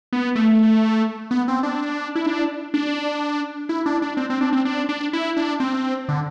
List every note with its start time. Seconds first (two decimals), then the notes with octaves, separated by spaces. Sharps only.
0.13 B3
0.36 A3
1.31 B3
1.48 C4
1.63 D4
2.15 E4
2.26 D4
2.74 D4
3.69 E4
3.86 D4
4.02 D4
4.17 C4
4.30 C4
4.41 D4
4.53 C4
4.65 D4
4.89 D4
5.13 E4
5.37 D4
5.60 C4
6.09 D3